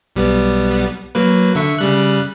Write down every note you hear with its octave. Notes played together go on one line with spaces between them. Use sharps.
B1 G3 B3
F#3 A#3 B4
D3 E5 C#6
C#3 G3 F#6